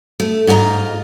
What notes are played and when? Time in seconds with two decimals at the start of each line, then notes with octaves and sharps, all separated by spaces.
0.20 A3
0.47 G#2 F4 G4 D#5 A#5